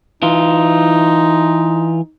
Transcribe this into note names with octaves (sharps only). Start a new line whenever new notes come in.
E3 D#4 F4